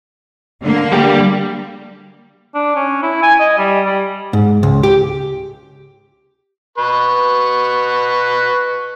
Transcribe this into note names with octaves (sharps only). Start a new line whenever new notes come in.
D3 A#3
G3 G4
D4
C#4
E4
G#5
D#5
G3
G3
G#2
C#2
G4
B4 C#6